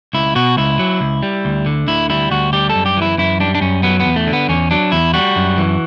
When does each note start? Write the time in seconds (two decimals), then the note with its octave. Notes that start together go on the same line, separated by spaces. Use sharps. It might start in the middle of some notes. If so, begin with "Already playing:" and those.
0.13 C#2 E4
0.36 B2 F#4
0.57 C#2 E4
0.79 F#3
1.01 C#2
1.23 G3
1.45 D2
1.66 D3
1.88 D2 E4
2.10 G3 E4
2.31 D2 F#4
2.53 G3 G4
2.70 A4
2.75 F#2
2.86 G4
2.97 E3 E4
3.18 F#2 E4
3.40 G3 D4
3.55 D4
3.61 F#2 C#4
3.83 F#3 B3
4.00 B3
4.05 E2
4.16 A3
4.27 D3
4.33 B3
4.49 E2 C#4
4.71 F#3 D4
4.92 E2 E4
5.14 G3 F#4
5.36 F#2
5.58 E3